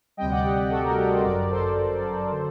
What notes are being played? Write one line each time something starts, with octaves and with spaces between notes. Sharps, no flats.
D2 C3 G3 D#5 G5
D5 F#5
G4
G4
F#4 A4
G4 A#4
G4 A#4
A4 C5
G1 F#2 F#3 A#4 D5
A4 C5
D3 F#3